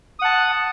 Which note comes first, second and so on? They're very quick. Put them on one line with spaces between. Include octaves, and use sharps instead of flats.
D#6 F#5 A5